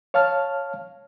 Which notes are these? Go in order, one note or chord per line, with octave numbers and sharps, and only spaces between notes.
C#5 F5 A5 F6